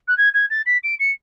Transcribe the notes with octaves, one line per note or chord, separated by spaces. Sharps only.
F#6
G#6
G#6
A6
B6
D7
C#7